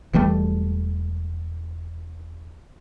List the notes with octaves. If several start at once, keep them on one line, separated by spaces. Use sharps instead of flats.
E1 E3 G3 A3